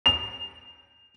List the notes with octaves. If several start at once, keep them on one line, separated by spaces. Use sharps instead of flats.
F7